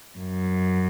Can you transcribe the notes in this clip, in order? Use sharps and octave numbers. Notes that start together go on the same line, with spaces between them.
F#2